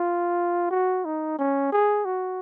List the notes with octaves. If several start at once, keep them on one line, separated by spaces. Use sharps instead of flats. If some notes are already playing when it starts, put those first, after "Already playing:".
Already playing: F4
F#4
D#4
C#4
G#4
F#4